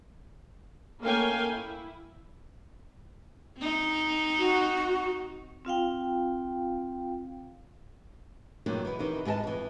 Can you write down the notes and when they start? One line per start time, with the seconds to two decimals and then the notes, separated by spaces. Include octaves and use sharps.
1.01 A3 A#3 C#4 F5 G5 G#5
1.50 E4
3.57 C4 D#4
4.39 F#4
5.65 C4 F4 F5 G5
8.66 G2 A#2 D#3 F#3 A#3 D4
8.85 E3 B3
8.99 C3 D#3 E3
9.25 G#2 B3 G#4 D#5 A5
9.44 F2 E3